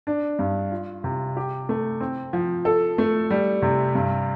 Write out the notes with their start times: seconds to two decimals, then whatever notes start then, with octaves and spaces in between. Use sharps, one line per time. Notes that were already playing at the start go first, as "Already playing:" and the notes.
0.07 D4
0.39 G2
0.71 F4
1.04 C3
1.37 G4
1.69 A3
2.00 C4
2.33 F3
2.65 A4
2.98 A3
3.30 G3
3.62 C3
3.95 G2